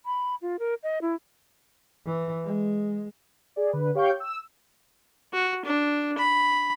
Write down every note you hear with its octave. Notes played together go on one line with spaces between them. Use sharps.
B5
F4
A#4
D#5
E4
E3
G#3
G#4 D5
D3 B4
G4 C#5 F5 G5 C#6 G6
E6
F#4
D4
B5